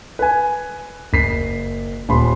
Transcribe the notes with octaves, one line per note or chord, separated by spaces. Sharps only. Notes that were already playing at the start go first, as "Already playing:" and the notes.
B4 G#5
F#1 B6 C7
D#1 B5 C6